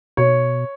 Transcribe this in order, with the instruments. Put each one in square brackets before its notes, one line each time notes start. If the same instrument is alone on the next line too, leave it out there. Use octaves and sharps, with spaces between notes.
[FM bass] B2 [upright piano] C#5